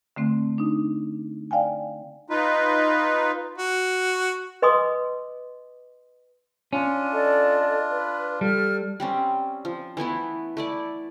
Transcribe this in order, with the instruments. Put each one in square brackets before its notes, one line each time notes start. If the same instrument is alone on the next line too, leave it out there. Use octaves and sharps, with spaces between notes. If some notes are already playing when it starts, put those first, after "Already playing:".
[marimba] D3 A3 C4
D4 D#4
D5 F5 G5 G#5
[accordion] D#4 F4 B4
[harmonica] F#4
[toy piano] B4 D#5 G#5 C6 D6 D#6
[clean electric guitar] C#4 [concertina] D4 F4
[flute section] A4 D5 D#5
B4
[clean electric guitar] G3 [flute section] A4 F6
[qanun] G3 C4 C#4
F3
E3 A3 B3 E4
A3 E4 D5